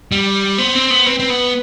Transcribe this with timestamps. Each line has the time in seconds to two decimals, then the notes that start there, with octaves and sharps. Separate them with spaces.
0.12 G3
0.58 B3 C5
0.75 C4
0.90 B3
1.06 C4 B4
1.20 C4
1.30 B3